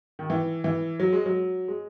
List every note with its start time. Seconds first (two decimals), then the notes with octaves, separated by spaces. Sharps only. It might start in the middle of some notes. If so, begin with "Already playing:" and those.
0.19 D#3
0.30 E3
0.64 E3
1.00 F#3
1.13 G#3
1.26 F#3
1.68 G#3